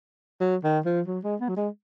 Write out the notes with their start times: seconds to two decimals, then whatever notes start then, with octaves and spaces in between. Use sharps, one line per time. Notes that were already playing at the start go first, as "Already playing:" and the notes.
0.41 F#3
0.64 D#3
0.86 F3
1.07 F#3
1.24 G#3
1.41 B3
1.49 F#3
1.57 G#3